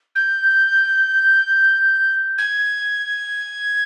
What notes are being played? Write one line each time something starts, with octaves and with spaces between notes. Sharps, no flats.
G6
G#6